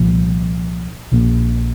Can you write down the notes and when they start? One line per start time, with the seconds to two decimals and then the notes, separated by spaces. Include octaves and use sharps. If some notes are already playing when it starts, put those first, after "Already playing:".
Already playing: C2 A#2 F3
1.12 A#1 A#2 A#3